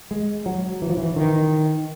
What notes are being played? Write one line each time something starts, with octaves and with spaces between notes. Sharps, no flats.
G#3
F#3
E3
F3
E3
D#3